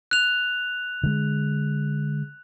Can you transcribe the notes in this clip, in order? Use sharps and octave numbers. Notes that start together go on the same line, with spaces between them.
F#6 F7
D3 G#3